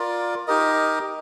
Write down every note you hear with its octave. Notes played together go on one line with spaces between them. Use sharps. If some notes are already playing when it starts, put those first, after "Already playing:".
Already playing: F4 A#4 D5
D#4 G4 A#4 D#5